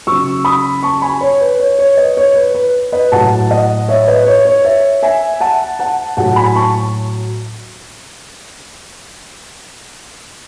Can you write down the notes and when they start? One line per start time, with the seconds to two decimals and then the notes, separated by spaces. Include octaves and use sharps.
0.07 C#3 F#3 C#6 E6
0.45 B5 D#6
0.83 A5 C#6
1.02 G#5 B5
1.21 C#5
1.41 B4
1.60 C#5
1.79 C#5
1.97 B4 D#5
2.17 C#5
2.35 B4
2.55 B4
2.92 B4 D#5
3.12 A2 F#3 F#5 A5
3.50 D#5 F#5
3.88 C#5 E5
4.07 B4 D#5
4.26 C#5
4.45 C#5
4.64 C#5 E5
5.03 E5 G#5
5.40 F#5 A5
5.79 F#5 A5
6.17 A2 F#3 F#5 A5
6.36 G#5 B5
6.55 A5 C#6